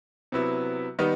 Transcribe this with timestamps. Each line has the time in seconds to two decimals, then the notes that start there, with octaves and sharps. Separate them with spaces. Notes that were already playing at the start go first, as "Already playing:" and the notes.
0.32 C3 F#3 B3 E4
0.99 D#3 G3 B3 D#4